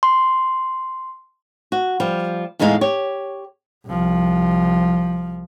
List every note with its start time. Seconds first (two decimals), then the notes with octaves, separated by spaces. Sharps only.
0.03 C6
1.72 F#4
2.00 F3 G3
2.59 E2 A2 G#3 D#4 C#5 F5
2.81 G4 C#5
3.87 C2 F3